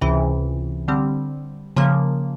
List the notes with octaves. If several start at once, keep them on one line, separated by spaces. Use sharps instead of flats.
C#2 C3 E3
D3 G3 C4
C#3 F3 A#3